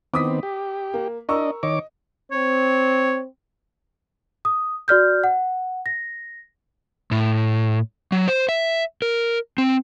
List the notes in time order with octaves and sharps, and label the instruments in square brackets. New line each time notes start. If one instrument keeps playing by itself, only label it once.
[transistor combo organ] D#3 B3 C4 [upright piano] D6 D#6 B6
[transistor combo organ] G4
[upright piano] A#3
[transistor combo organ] D4 D#5 [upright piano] A#4 C#6 E6
[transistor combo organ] D#3 C#5 D6 [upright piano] D#5
[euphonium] C4 [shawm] C#5
[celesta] D#6
F#4 D5 F6 G6
F#5
A#6
[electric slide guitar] A2
F#3
C5
E5
A#4
C4